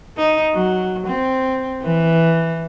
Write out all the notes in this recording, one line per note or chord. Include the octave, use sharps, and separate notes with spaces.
D#4
F#3
C4
E3